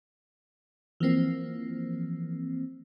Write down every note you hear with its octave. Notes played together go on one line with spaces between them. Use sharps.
E3 F3 A#3 C4